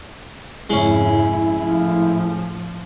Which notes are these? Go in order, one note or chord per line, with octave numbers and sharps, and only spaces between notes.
F2 G#2 C#3 G#3 C#4 E4
A2 F3